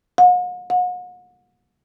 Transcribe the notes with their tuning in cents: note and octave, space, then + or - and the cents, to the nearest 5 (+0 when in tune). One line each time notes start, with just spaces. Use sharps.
F#5 -45
F#5 -40